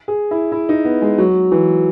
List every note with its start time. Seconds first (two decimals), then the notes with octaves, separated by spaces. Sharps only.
0.08 G#4
0.31 E4
0.52 E4
0.69 D#4
0.85 B3
1.02 G#3
1.18 F#3
1.52 E3